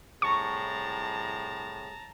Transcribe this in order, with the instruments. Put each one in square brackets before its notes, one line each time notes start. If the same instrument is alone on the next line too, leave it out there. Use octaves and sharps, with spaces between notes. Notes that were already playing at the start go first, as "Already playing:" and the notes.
[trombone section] C2 A2 G#4 [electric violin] A5 A#5 [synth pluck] C#6